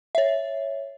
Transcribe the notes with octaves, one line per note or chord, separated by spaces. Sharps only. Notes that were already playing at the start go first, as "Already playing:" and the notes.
C#5 E5